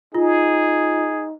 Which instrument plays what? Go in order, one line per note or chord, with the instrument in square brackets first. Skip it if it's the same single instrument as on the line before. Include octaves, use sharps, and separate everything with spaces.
[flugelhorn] D#4 [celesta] F4 [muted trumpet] G#4